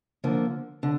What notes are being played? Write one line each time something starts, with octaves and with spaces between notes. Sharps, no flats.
D3 F3 A#3
D3